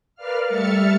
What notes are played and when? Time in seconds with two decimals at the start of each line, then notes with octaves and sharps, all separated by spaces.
0.15 A#4 B4 D5 F5 F6
0.47 G3 A3 E5 F6 A6 C#7